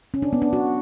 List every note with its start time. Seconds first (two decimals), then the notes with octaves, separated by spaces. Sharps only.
0.14 C#4
0.22 D4
0.33 B3
0.42 D4
0.53 F#4